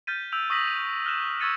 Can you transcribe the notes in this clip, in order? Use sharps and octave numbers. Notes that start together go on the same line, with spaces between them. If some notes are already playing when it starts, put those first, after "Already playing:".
F6 G6 A6 B6 D#7
E6 G6 D7 F7
C#6 D#6 E6 A#6 B6 F#7
D#7
F6 F#6 E7
C#6 E6 G#6 A6 C#7 D#7